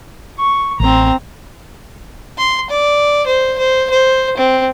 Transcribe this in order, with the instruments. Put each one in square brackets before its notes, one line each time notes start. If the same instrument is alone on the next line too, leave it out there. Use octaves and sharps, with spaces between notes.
[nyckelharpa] C#6
[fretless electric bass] A1 [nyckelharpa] C4 A#5
[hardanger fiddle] C6
D5
C5
C5
C5
C4